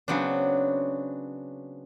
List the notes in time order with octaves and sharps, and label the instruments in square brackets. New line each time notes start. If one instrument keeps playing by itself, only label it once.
[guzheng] C#3 F#3 B3 C4 D4